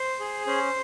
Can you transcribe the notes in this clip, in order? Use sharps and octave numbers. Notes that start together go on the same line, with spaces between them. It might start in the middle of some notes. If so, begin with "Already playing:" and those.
Already playing: C5
G#4
C#4 C5